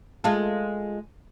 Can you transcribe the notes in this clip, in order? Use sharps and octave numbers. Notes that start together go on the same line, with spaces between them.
G#3 F4 A4